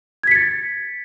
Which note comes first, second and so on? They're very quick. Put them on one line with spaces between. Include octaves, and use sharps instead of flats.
G#6 B6 C#7 A6